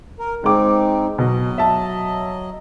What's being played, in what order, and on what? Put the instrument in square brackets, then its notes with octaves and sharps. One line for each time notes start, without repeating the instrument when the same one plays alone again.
[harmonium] A#4
[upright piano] G#3 D6 [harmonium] C4 D#4
[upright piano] B2 [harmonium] F#3 D#5
[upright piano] E5 A5